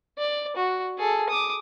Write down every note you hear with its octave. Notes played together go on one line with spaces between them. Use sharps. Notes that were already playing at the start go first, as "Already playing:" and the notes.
D5
F#4
G#4 A4
D6 D#6